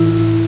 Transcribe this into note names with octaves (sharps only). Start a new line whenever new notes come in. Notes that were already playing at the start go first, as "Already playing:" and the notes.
Already playing: A2 E3 E4